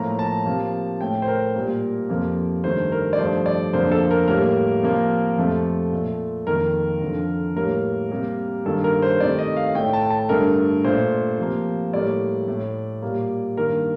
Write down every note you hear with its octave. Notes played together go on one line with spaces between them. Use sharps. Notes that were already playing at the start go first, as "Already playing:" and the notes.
Already playing: A2 F3 A#3 A#5
A5
C3 F3 A#3
A2 A3 G5
C5
A#4
A#2 G3 A#3
F2 C3 F3 A#3
G2 D#3 A3 C5
A#4
D5
G2 F3 A3 C5
D5
F2 D3 F3 A#3 C5
A4
A#4
A2 G3 A#3 A#4
C3 F3 A#3
F2 C3 F3 A3
A#2 A3
F2 D#3 A#3 A#4
F2 D3 F3
A2 G3 A#3 A#4
C3 G3 A#3
G2 D#3 A#3 A4
A#4
C5
C3 D#3 A3 D5
D#5
F5
A2 A3 G5
A5
A5
G2 D3 A3 A#4
A#2 A3 C5
C3 F3 A#3
A2 G3 A#3 D5
A2 A3
A#2 G3 A#3
G2 D#3 A#3 A#4